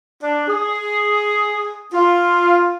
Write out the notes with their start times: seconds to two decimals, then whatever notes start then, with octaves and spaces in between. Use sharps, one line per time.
0.23 D4
0.48 G#4
1.93 F4